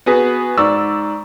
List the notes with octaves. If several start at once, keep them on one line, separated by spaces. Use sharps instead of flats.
B3 F#4 G#4 B4
G#2 D5 C#6 E6